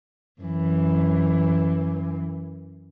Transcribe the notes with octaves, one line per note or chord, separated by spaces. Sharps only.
F#2 E3